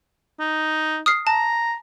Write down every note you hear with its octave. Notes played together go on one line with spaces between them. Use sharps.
D#4
D#6 F6 C7
A5 A#5